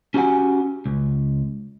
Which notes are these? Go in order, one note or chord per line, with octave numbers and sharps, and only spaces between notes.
C#4 F#4 G4 D5 F#5 G#5
C#2